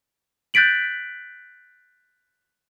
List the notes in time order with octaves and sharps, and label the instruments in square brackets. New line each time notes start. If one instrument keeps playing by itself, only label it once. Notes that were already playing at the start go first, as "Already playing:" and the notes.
[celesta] F#6 G6 A6 B6 D7 F#7